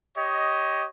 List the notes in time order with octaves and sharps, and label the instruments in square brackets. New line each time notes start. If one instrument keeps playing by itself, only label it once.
[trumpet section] G4 C#5 D#5